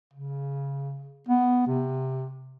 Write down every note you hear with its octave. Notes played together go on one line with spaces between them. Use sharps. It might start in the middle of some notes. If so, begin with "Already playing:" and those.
C#3
B3
C3